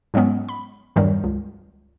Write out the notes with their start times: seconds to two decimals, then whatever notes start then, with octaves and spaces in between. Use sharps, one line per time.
0.14 G#2 F#3 G#3 B3 C#4
0.49 B5
0.96 E2 G2 D#3 F#3 G3
1.24 C#2